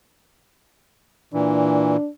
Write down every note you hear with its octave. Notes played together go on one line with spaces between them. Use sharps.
A#2 E3 D4